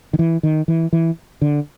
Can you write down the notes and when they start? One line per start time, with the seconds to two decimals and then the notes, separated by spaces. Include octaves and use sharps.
0.13 D#3
0.19 E3
0.43 D#3
0.68 E3
0.93 E3
1.42 D3